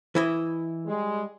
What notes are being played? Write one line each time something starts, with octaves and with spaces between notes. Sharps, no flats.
E3 E4 D#5
G3 G#3